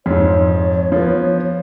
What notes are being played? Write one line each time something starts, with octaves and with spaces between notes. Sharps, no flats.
F2 G#2 C#5
F3 B3